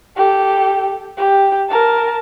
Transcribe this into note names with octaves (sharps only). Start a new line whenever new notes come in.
G4 A4
G4
A#4 A5